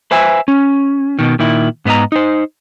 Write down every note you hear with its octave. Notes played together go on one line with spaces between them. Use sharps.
B4 C5 E5 G#5
C#4
B2 D#3
A#2 D#3 E4
G#2 B3 D4 D#5 A#5
D#4 C5